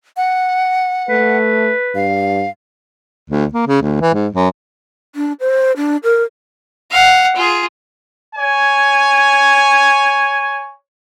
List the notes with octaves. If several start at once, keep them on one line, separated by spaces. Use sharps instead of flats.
F#5
A3 B4
G2 F5
D2
A#3
C#3
D2
E3
G#2
F#2
D4
C5
D4
A#4
F5 F#5
F4 G#4
C#5 G#5